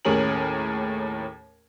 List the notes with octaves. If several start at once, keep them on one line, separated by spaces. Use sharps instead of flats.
D#2 A2 C#4 G#4 A#4 F#7